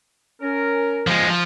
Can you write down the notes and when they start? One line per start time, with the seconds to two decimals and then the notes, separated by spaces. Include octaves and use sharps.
0.41 C#4 A#4
1.07 F3 G#3
1.28 F3